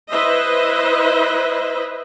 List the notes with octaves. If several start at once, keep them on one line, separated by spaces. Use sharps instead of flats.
E4 B4 C5 D#5 E5